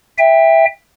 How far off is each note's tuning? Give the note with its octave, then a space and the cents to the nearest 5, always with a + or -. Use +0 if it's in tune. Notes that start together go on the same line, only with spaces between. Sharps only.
E5 +0 G5 +25